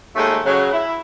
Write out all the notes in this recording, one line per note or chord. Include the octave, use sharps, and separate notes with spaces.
D#2 G#3 A3
C#3 F#3
E4